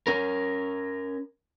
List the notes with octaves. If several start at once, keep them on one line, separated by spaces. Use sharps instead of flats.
C#4 A#4